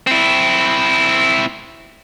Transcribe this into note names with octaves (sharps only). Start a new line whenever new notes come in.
C4 E4